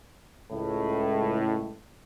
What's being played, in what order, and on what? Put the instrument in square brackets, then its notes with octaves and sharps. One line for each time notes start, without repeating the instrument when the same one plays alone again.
[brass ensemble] C#2 A2